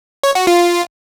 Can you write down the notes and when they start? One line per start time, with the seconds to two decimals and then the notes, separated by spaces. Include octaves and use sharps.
0.23 C#5
0.35 F#4
0.47 F4